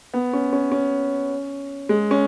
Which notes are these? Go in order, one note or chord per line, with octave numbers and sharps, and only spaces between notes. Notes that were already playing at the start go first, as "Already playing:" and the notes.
B3
C#4
C#4
C#4
G#3
C#4